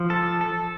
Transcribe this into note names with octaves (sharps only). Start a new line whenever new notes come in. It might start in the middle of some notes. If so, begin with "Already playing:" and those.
Already playing: F3
A4
A4